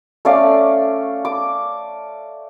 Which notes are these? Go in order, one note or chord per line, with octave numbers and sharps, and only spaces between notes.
A3 C#4 D5 F5
D6